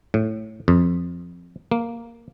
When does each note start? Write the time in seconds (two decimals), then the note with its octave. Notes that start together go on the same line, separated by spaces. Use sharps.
0.14 A2
0.68 F2
1.71 A#3